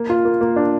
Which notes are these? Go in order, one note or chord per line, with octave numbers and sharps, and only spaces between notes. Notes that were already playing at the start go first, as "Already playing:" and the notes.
Already playing: A#3
F4
A#3
A#3
D4